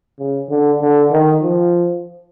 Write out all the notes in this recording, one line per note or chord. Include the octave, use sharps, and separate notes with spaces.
C#3
D3
D3
D#3
F3